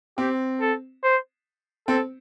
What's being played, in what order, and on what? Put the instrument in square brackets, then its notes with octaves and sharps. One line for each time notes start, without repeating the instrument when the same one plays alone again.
[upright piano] C4 [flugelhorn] G4
[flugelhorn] A4
C5
[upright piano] C4 [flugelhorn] A4